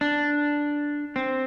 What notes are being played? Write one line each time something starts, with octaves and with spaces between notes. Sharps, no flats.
D4
C4